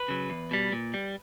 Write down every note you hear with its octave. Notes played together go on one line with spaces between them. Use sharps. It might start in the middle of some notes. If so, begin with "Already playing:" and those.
Already playing: B4
C#3 F#3
E2
B2 G3
A#2
G3